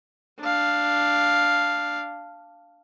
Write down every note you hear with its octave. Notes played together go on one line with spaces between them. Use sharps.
D4 F5